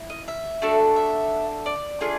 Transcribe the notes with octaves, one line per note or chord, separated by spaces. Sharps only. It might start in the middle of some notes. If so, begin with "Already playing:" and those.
Already playing: E4
D#5
E5
A3 D4 F#4 A4
E5
D5
A3 D4 F4 G#4